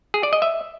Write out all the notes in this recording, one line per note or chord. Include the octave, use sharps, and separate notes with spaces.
G#4
D5
D#5
E5